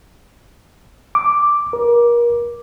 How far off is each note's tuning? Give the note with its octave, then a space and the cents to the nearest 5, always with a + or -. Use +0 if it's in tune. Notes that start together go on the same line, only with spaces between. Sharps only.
D6 +0
A#4 +30